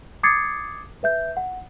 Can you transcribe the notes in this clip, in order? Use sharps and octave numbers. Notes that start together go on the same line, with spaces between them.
D6 D#6 G#6 A6 C7 C#7
B4 E5 G6
F#5